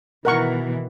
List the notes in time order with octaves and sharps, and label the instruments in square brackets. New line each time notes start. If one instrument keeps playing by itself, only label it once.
[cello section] B2 D#3 E3 [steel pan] A#4 F#5 C#6